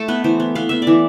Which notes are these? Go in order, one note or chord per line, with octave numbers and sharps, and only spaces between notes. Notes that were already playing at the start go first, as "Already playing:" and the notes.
Already playing: A3 A4
B3 B4
E3 C5
B3
B3 F5
B3 E5
D5
E3